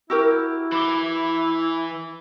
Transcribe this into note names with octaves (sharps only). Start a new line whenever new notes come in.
E4 F#4 G4 A#4 E6
E3 B5 D6 G7